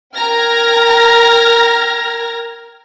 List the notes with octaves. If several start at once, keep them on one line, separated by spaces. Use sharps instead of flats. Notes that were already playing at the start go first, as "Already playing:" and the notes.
A#4 G5 A#5 F6 G#6 A#6